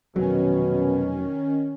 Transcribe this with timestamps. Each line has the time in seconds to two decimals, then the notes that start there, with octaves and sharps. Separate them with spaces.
0.16 F1 B2 D#3 F#3 C#4